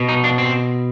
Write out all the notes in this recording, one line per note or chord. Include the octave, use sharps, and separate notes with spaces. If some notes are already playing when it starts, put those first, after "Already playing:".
Already playing: B2
D#4
D4
C4